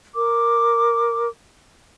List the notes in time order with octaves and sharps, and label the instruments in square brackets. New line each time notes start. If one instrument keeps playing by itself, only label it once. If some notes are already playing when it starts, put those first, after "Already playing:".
[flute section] A#4 D6